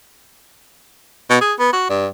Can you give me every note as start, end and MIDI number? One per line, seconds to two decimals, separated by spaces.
1.30 1.39 47
1.41 1.54 68
1.59 1.71 59
1.73 1.89 66
1.90 2.07 43